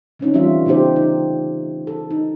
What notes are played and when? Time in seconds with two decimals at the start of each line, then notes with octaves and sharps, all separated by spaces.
0.19 D3 C4 C#4 D#4
0.34 E3 G3 A3 F4 E5
0.66 C#3 A3 B3 D#4 G4 C5
0.96 D#4
1.87 A4
2.11 D#4